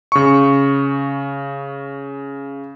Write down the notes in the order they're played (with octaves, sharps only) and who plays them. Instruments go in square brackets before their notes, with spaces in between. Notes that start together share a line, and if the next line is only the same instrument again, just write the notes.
[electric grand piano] C#3 C#6